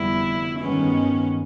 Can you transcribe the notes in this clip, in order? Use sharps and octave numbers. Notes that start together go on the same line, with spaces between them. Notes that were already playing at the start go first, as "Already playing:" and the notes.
Already playing: F1 F2 D3 G3 B3 E4
G2 D#3 G#3 B3 C#4